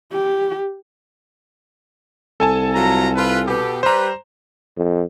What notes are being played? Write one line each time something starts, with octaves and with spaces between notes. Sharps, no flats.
G4
C2 A4 G#5 A5
F#3 F4 A#5
F4 B4
B2 B3 G4
G3 B4 C5 A#5
F2